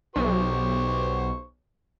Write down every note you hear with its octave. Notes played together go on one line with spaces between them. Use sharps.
B1 G4 C5 C#6